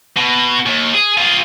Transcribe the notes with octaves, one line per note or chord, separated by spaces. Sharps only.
B2
D#2
G#4
F4 G#4